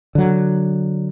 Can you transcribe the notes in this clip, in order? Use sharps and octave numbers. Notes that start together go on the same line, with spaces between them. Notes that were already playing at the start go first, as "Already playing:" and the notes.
D3 F#3